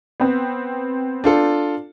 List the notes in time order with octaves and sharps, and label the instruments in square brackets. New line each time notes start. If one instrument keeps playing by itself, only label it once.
[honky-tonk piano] B3 C4
[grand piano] D4 F4 A4